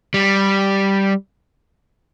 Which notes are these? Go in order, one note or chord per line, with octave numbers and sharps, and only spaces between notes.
G3